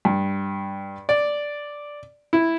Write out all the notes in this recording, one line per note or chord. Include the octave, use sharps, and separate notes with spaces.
G2
D5
E4